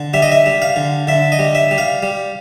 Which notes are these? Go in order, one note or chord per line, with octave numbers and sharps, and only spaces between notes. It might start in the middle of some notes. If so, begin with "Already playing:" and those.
Already playing: D3
G3 E5
D#5
E5
G3
F5
D3
D3 E5
D#5
G3
E5
G3
F5
G3